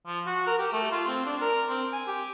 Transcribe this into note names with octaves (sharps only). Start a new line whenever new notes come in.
F3
F#4
A#4
G4
A3
F4
C4
D4
A#4
C4
G#5
G4